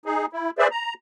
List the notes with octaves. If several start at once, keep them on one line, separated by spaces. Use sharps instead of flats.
D#4 G#4
E4
G#4 B4 C5 D5 E5
A#5